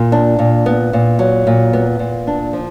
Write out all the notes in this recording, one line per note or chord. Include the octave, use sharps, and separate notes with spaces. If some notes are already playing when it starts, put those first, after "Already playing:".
Already playing: A#2
D4
A#2
B3
A#2
F#3
A#2
B3
A#2
D4
F3